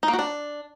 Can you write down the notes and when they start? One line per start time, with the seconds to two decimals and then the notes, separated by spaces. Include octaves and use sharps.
0.03 D#4
0.08 A#3
0.13 F#4
0.19 D4